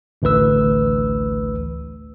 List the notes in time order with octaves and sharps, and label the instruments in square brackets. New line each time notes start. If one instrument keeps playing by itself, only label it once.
[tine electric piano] A1 D2 E3 B4 E6